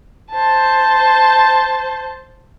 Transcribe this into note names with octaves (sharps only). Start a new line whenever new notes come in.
C5 A5